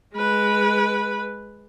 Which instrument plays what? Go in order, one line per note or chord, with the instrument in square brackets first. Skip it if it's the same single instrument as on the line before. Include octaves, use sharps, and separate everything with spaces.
[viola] G#3 B4